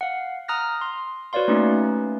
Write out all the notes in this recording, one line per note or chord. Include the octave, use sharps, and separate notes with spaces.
F5 F#5
A#5 D#6 F6 F#6 A#6
C6
F#4 B4 C#5 D5 F5 C6
A3 A#3 C#4 D#4 B4